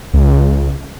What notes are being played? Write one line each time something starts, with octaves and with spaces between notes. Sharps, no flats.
C#2